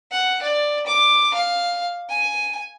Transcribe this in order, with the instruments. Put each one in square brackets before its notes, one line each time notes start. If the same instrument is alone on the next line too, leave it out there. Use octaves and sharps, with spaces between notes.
[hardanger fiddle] F#5
D5
D6
F5
G#5